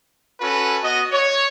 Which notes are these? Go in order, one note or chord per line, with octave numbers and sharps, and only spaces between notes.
C#4 F#4 A4 B4
B3 F#4 D#5
C#5